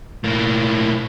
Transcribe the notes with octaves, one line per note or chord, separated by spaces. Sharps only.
A2 A#3